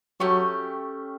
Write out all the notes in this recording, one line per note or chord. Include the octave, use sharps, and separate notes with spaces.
F#3 A3 C#4 G4